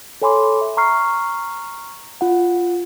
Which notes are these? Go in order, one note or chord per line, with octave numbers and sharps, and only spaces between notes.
A4 C#5 G#5 B5 C6 D6
E5
A#5 C#6 F6 C7
F4 F#5